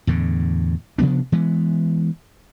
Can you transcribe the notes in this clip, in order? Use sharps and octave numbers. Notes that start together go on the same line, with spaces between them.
E2 A2 D3
C3 F3 B3 D4
E3 G#3 B3